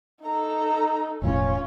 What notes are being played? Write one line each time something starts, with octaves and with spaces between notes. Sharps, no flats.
D#4 A4 A#5
E1 A2 F3 C#4 F4 C#5